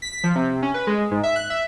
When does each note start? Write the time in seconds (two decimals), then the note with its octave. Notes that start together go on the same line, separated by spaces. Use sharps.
0.02 B6
0.24 F3
0.35 C3
0.62 C#4
0.74 B4
0.87 G#3
1.11 G#2
1.23 E5
1.36 F#6
1.50 E5